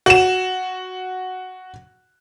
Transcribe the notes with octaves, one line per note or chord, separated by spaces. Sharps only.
F#4 E7